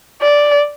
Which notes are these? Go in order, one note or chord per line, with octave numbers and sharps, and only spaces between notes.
D5